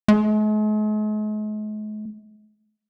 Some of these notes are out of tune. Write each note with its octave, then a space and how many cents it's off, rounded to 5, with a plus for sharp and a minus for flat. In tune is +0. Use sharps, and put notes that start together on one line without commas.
G#3 +45